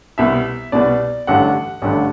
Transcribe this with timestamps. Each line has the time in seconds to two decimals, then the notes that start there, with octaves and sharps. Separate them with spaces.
0.18 C2 B2 E5
0.72 C2 B2 D5
1.27 A1 G2 D3 F#5
1.82 A1 G2 D3